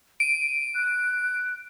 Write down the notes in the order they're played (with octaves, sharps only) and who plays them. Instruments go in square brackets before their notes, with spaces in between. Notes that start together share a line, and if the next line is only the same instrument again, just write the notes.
[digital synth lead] D7 [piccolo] D#7
[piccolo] F#6